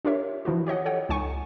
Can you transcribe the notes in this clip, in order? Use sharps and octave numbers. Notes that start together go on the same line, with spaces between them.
D4 F4 G4 A#4 C#5 E5
E3 F3 E4 F#4
G4 C#5 D#5 F#5
A4 C#5 F#5 G5
C#2 D#4 G#5 C#6